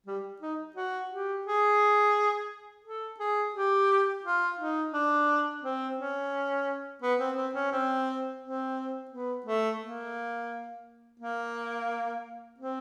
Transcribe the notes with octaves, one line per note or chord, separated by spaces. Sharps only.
G3
D#4
F#4
G4
G#4
A4
G#4
G4
F4
D#4
D4
C4
C#4
B3
C4
C4
C#4
C4
C4
B3
A3
A#3
A#3
C4